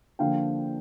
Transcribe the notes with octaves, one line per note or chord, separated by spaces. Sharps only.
D3 F3 A#3 D4 F5 G5